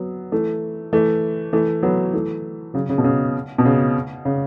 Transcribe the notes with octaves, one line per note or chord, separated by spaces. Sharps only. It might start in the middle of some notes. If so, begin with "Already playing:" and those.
Already playing: F#3 B3
E3 A3
E3 A3
E3 A3
F#3 B3
E3 A3
C#3 F#3
C#3
B2
C#3
B2
C#3
C#3